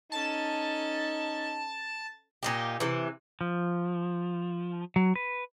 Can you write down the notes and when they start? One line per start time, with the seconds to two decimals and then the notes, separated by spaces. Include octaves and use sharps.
0.12 C#4 D#4 A4 A5
2.43 A#2 D#4 G4
2.80 C3 E3
3.41 F3
4.96 F#3
5.16 B4